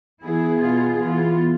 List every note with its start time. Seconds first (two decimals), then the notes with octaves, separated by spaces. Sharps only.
0.22 E3 B3 E4 G#4
0.60 B2 B3 F4 G#4
0.99 E3 B3 F4